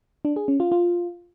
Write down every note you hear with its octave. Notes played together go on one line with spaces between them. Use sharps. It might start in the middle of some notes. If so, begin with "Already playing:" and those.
D4
G#4
C#4
F4
F4